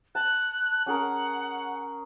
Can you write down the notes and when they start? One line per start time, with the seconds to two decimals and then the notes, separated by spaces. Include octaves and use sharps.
0.15 A5 F#6
0.86 C#4 G#4 A#4 F#5